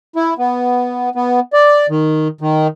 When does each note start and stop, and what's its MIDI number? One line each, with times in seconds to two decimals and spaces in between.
0.16 0.34 64
0.38 1.09 59
1.15 1.40 59
1.53 1.86 74
1.89 2.28 51
2.41 2.67 51